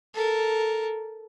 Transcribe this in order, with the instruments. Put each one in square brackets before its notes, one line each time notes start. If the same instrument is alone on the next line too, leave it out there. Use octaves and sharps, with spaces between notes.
[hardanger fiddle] A4 A#4